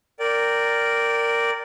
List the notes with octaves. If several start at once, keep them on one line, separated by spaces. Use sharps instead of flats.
A#4 D5 G5